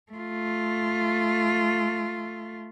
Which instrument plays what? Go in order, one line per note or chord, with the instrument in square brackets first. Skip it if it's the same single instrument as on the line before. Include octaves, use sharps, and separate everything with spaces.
[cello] A3 F4